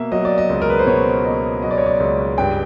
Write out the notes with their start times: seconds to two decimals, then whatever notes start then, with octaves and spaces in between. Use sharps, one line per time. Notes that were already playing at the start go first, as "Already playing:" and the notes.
Already playing: B2 A#3 E5
0.12 F#3 D#5
0.25 D5
0.38 D#5
0.50 C#2
0.62 A#4
0.70 B4
0.79 C5
0.87 B2 C#5
1.24 A#3 D#5
1.63 F#3 D#5
1.71 D5
1.78 C#5
1.86 D5
2.00 C#2
2.38 G2 G5